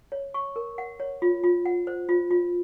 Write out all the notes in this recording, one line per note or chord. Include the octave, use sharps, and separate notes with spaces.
C#5
C#6
A#4
F#5
C#5
F4
F4
F#5
C5
F4
F4